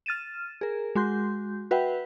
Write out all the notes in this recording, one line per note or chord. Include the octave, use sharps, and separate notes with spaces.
F6 A6 D#7 E7
G#4 A#4
G#3 F#4 C6 G6
F#4 B4 E5 F#5 G5